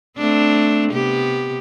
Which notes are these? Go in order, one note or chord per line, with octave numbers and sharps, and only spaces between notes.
A3 C4 D4
C3 B3 G4